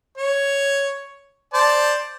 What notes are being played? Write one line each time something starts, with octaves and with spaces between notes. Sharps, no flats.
C#5
C5 D5 A5